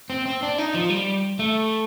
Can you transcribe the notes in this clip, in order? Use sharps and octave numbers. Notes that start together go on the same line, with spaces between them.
C4
C4
D4
D#4
F3
G3
A3